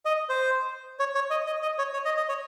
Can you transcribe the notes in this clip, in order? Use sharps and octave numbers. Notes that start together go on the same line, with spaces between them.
D#5
C5
C#5
C#5
D#5
D#5
D#5
C#5
C#5
D#5
D#5
C#5